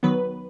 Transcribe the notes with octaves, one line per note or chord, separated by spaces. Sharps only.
D#3 F#3 B3 B4